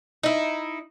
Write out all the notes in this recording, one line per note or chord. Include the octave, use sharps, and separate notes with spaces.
D#4 E4